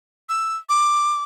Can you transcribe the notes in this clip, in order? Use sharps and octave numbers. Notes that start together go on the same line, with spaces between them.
E6
D6